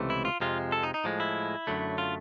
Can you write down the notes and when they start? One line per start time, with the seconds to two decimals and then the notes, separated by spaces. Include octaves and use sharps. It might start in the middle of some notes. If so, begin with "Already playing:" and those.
Already playing: C#2 C3 E3 A3
0.10 E4
0.25 F4
0.40 F2 C3 F3 G#3 F4
0.72 A4
0.83 D#4
0.94 D#4
1.04 A2 F3 G#3
1.20 E4
1.67 F#2 D3 F#3 A3
1.98 F4